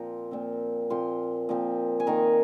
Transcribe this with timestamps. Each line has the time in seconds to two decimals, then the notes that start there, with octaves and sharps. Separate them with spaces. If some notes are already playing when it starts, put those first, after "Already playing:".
Already playing: A#2 F3 C4 A#5 C6
0.31 A#2 F3 C4
0.90 A#2 F3 C4 C6
1.49 A#2 F3 C4
2.00 G#5
2.07 D#3 A#3 A#5